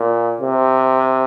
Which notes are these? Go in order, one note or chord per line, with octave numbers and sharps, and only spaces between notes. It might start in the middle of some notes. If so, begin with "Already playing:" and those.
Already playing: A#2
C3